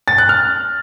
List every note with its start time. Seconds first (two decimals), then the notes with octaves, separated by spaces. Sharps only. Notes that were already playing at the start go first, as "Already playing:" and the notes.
0.08 A6
0.18 F#6
0.29 F6